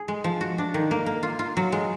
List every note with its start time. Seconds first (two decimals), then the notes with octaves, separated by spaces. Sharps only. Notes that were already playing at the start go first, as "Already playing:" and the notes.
Already playing: G#4
0.08 G#3
0.24 F3
0.41 F#4
0.58 D4
0.74 D#3
0.91 A#3
1.06 A#3
1.23 F4
1.39 F4
1.57 F#3
1.72 G#3